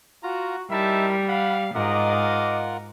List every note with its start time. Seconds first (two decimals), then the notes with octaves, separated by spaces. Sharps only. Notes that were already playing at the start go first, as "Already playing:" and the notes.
0.23 F4 F#4 A#5
0.71 G3 D#4 E4 A#4 E5 A5
1.28 F5 F#5 B5
1.75 G#2 F4 A#4 D#5 F#5 D6